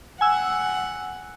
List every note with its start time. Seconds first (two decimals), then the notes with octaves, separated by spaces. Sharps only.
0.21 F#5 G#5 E6